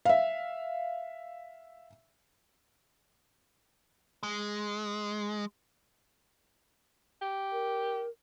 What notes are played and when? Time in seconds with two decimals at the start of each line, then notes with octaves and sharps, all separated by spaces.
0.05 E5 F5
4.23 G#3
7.22 G4
7.52 A#4